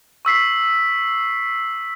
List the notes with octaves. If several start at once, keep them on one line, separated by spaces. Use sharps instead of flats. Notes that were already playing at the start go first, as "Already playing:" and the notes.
C#6 E6 B6 C7